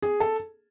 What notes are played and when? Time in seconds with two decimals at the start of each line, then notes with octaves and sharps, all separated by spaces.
0.02 G#4
0.20 A4